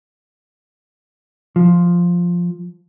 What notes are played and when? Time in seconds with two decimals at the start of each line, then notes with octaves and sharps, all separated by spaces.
1.56 F3